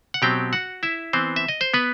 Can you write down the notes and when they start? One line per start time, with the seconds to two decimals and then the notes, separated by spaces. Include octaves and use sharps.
0.14 F#5
0.22 B2 F#3 C4 G4 G5
0.53 F#4 F#5
0.83 E4 E5
1.13 E3 B3 C4 C5
1.36 E5
1.49 D#5
1.61 C5
1.74 B3 B4